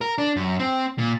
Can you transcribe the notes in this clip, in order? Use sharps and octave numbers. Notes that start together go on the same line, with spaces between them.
A#4
D4
F#2
C4
A#2